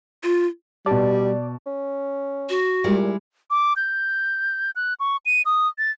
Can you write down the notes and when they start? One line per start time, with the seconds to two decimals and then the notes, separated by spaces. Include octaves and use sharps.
0.23 F4
0.86 B2 G3 D5 A5
1.66 C#4
2.49 F#4
2.84 A#2 G3 G#3 E4
3.51 D6
3.76 G6
4.76 F#6
5.00 C#6
5.26 D#7
5.45 D#6
5.78 A6